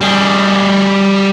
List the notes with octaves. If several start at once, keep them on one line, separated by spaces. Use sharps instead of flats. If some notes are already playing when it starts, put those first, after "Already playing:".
G3 G#4